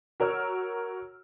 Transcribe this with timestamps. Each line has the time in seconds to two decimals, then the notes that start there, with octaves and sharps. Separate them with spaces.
0.20 F#4 A#4 C#5 E6 F6